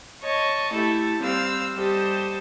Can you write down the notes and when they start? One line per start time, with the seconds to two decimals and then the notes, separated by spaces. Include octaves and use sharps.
0.24 C#5 D#5 A5 C#6
0.72 A3 E4 G4 A4
1.23 G3 C4 C5 F5 E6
1.77 G3 G4 A4 C5 D#5